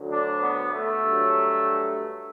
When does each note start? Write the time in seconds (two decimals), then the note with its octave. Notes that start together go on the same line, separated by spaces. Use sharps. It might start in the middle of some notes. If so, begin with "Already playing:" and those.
Already playing: D2 D3 F#3
0.11 D4
0.41 B3
0.73 A3
1.02 G2 F#3